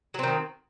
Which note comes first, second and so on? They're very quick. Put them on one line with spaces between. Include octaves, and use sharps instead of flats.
F#3 C4 D#3